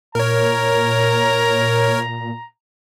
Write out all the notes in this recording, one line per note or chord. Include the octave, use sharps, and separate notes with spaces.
A#2 A#4 C#5 A#5